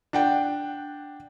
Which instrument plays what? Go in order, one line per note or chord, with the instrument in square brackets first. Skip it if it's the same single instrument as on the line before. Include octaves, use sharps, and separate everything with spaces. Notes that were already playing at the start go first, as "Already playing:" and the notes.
[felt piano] D4 F#5 G5